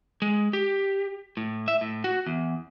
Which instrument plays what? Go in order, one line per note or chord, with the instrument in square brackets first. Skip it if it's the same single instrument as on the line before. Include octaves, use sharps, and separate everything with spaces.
[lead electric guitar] G#3
G4
A2
E5
A2
F#4
E2